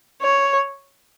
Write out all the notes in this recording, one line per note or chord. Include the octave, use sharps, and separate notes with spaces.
C#5